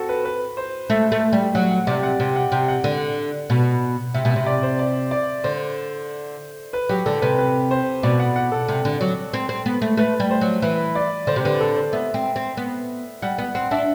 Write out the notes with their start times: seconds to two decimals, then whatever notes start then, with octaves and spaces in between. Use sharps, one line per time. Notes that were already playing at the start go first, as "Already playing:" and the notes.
Already playing: C4 F#4 A4
0.09 B4
0.25 B4
0.57 C5
0.90 A3 E5
1.12 A3
1.33 G3
1.55 F#3 F#5
1.71 F#5
1.87 C3 D5
2.03 F#5
2.20 C3 G5
2.36 F#5
2.52 C3 G5
2.68 F#5
2.84 D3
3.50 B2
4.14 C3 E5
4.25 B2
4.30 E5
4.36 C3
4.46 D5
4.63 C5
4.79 D5
5.11 D5
5.44 D3 C5
6.73 B4
6.89 F#3 G4
7.06 D3 A4
7.22 C3 B4
7.38 B4
7.71 C5
8.03 B2 D5
8.20 F#5
8.36 F#5
8.52 A4
8.68 C3
8.85 D3
9.01 F#3
9.33 C4
9.49 C4
9.66 B3
9.82 A3
9.97 A3 B4
10.20 G3
10.31 C5
10.41 F#3
10.62 E3 B4
10.95 D5
11.27 D3 C5
11.36 C3
11.44 D3 B4
11.60 A4
11.76 C5
11.93 B3 E5
12.14 C4
12.36 C4
12.57 B3
13.22 G3 F#5
13.38 B3 F#5
13.55 C4 F#5
13.71 D4 E5